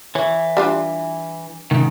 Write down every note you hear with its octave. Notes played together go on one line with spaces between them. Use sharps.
E3 C#5
G3 D4 F4
C#2 G#2 C3 D#3